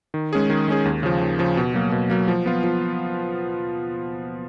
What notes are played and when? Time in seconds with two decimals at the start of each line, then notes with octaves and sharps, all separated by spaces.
0.14 D#3
0.33 G#3 C#4 G#4
0.50 D#3
0.68 G#3 C#4 G#4
0.85 D#2
1.03 C#3 F3
1.21 D#2
1.39 C#3 F3
1.57 B2
1.74 F#3 A#3
1.92 B2
2.10 F#3 A#3
2.28 F3
2.46 B3 F4
2.64 F3